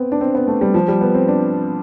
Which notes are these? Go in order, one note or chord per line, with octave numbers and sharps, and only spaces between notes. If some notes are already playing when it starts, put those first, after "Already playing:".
Already playing: B3 C4
D4
C4
B3
A3
G3
F3
G3
B3
C4
D4